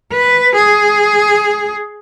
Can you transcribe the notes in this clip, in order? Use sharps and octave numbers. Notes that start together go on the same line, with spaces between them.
B4
G#4